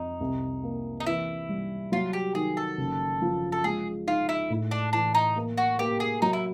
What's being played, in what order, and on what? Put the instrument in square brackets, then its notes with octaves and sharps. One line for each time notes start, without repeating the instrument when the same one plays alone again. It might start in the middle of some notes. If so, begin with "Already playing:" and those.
Already playing: [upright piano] F2 [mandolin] D#4
[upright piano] C2
A#3
[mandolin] D#4
[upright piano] E3 [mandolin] E4
[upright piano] G3
[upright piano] F#3 [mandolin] F4
[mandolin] G4
[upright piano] D#3 [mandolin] G#4
[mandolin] A4
[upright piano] F#1
F3
[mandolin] A4
[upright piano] G#3 [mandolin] G#4
[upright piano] D#4 [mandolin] F4
[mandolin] E4
[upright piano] A2
[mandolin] D4
[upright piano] E3 [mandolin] D4
[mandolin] D#4
[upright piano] A#3
[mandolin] F#4
[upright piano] A#3 [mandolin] G4
[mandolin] G#4
[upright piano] F#3 [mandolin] D#4
[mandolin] E4